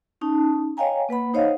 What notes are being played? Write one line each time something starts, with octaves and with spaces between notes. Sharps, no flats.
C#4 D#4 A5
C#5 D#5 F5 G5 G#5 A#5
A#3 B4 F#5 B5
D#4 C5 C#5 D#5 F5 F#5